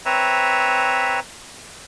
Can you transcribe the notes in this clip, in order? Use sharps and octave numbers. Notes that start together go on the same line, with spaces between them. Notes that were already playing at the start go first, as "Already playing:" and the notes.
C4 B4 C#5 E5 A#5